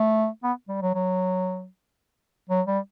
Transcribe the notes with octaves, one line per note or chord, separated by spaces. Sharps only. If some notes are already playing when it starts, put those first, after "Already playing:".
Already playing: A3
B3
G3
F#3
F#3
F#3
G3